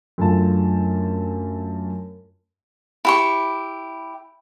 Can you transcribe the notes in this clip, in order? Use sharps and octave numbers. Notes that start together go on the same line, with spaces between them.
F#2 D3 A3 F4 A5
E4 G4 C#6